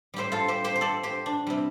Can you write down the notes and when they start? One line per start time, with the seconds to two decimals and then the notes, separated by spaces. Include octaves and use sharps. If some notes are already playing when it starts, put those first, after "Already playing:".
0.14 A2 G3 G4 C5
0.32 F4 A4
0.48 G4 C5
0.64 G4 C5
0.76 C5
0.81 A4 D5
1.03 G4 C5
1.26 D4
1.47 C3 G3